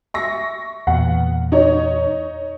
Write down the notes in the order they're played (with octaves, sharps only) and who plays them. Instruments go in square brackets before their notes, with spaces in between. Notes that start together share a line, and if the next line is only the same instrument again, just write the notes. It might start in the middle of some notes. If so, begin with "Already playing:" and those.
[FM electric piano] E5 [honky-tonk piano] C#6 A#6
[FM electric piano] E2 A#2 [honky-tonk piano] F#5
[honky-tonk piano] D#4 C#5